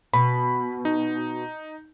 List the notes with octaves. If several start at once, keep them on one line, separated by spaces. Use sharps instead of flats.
B2 B5
D#4